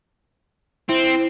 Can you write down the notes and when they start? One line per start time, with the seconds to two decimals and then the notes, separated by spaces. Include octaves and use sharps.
0.89 C4 E4